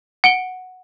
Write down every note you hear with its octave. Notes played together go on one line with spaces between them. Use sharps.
F#5 D7 G7